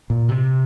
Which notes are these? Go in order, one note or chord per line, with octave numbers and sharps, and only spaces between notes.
A#2
C3